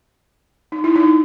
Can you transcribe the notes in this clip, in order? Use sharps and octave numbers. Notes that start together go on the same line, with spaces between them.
D#4
E4
D#4